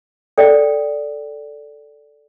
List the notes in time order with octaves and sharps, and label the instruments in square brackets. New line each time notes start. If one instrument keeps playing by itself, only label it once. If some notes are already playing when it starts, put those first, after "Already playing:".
[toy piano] A4 D5 G5